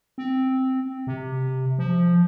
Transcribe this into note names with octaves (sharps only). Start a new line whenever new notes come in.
C4
C3
F3